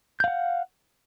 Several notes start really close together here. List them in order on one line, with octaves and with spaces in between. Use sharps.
G6 F5 F#5